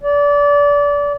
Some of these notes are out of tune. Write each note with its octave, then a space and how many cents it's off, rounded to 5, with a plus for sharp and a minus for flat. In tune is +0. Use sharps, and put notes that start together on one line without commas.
D5 -25